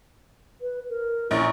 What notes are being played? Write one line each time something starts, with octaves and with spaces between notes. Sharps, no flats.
B4
A#4
A#1 C#4 E4 A#5